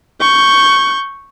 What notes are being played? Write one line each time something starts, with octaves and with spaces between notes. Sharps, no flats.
C#6 G6